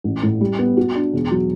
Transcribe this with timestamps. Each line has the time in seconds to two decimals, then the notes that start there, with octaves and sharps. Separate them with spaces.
0.04 A1
0.23 A2
0.41 G3
0.59 B3
0.77 F#4
0.95 D4
1.13 E1
1.31 F#3